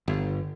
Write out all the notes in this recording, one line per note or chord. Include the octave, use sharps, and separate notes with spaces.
G1